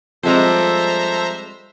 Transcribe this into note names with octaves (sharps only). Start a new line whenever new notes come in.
F3 G3 G#3 C4 A4 C5 E5 A#5